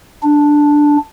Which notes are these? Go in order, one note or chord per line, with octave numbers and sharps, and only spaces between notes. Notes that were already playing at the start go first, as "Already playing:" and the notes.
D4